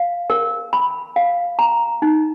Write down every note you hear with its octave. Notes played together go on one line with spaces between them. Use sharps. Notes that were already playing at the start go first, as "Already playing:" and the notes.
Already playing: F5
A#4
B5
F5
A#5
D#4